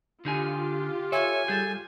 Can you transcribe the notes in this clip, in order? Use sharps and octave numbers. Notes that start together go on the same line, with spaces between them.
D3 D#4 F4 G4 G#5
A4 C#5 E5 G#5
G3 G#4 A4 G6